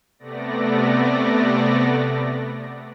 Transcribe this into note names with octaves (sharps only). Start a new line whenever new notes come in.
C3 A3 B3 D5 A#6